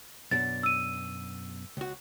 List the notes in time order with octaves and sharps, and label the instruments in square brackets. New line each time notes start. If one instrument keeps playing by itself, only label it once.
[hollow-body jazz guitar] F#2 B2 D4 [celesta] A6
[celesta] E6 D#7
[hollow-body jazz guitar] C#2 F#4